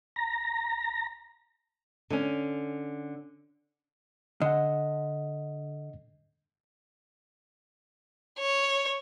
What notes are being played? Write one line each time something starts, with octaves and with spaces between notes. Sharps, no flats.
A#5
D3 C#4
D3 D#5 F#5
C#5